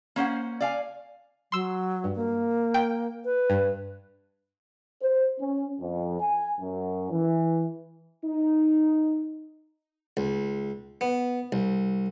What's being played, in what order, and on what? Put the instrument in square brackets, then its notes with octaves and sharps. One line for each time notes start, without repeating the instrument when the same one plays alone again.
[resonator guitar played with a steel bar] A#3 C#4 C5 F#5
D5 F5 G#5
[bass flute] F#3 [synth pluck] C6 E6
[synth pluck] G2
[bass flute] A#3
[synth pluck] G5
[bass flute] B4
[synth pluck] G2
[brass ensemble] C5
C#4
F2
G#5
F#2
E3
[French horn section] D#4
[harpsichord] C#2
B3
C2